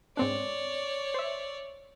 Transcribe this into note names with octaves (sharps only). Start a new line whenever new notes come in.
G#2 C4 D4 C#5 D5
C5 E5